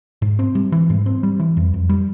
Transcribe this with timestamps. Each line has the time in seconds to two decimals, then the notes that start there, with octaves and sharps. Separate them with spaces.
0.22 G#2
0.39 C4
0.55 G3
0.72 E3
0.90 G#2
1.06 C4
1.23 G3
1.40 E3
1.57 F2
1.74 F2
1.89 G3